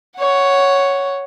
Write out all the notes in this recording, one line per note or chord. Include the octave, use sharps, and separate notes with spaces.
C#5 F#5